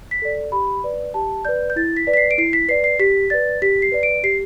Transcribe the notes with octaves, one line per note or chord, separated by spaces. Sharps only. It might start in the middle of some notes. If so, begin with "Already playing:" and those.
B6
A4 D5
G4 B5
B4 D5
G4 A5
B4 D5 G6
G6
E4 A6
B6
B4 D5
B6
C7
D7
E4 C7
B6
B4 D5 C7
C7
G4 B6
B4 D5 A6
G4 B6
C7
B4 D5
D7
G4 C7